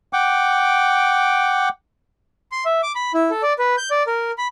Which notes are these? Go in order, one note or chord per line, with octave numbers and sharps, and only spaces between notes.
F#5 G5 D6
C6
E5
D6
B5
E4
A4
D5
B4
G6
D5
A#4
B5